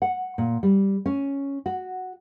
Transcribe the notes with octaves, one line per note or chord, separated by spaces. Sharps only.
F#5
A#2
G3
C#4
F#4